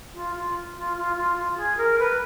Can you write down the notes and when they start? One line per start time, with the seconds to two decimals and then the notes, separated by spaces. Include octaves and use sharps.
0.14 F4
0.36 F4
0.77 F4
0.97 F4
1.16 F4
1.37 F4
1.57 G#4
1.77 A#4
1.99 B4